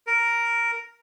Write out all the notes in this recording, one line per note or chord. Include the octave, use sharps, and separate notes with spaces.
A#4